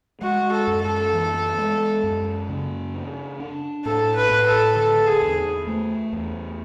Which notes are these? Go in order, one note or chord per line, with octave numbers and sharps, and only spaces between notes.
G#3 F#4
A4
F#2
A4
E3
G#3
F#2
C#3
D4
D4
A2 A4
B4
A2
A4
D3 A4
G#4
E2
A3
E2